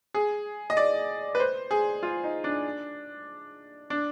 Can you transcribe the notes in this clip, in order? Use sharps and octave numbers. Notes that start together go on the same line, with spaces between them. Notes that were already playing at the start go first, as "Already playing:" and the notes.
G#4
D#5
D5
B4
C5
G#4
F4
D#4
D4
D4